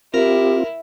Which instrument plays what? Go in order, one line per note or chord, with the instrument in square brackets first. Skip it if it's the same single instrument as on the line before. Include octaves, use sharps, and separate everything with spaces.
[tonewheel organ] C4 F4 [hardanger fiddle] E4 [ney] G4 [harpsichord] A#4